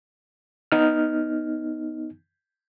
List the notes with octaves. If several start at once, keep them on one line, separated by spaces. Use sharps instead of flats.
B3 D#4 F6